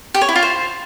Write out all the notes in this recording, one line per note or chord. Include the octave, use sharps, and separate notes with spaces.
G4
C#5
E4
F4
C5